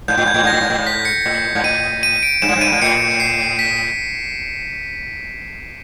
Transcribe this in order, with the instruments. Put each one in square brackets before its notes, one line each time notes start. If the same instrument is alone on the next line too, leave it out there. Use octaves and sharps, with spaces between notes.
[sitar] G#2 [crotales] G6
[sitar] A2
[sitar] G#2 [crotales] G#6
[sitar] A2
[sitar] G#2 [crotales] A#6
[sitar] A2
G#2
A2
G#2
[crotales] B6
C#7
[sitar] A2
G#2
[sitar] A2 [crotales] D#7
[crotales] D#7
D7
[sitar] G2 [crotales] E7
[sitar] G#2
G2
[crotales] D#7
[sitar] G#2
[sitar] A2 [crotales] C#7
[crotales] C7
B6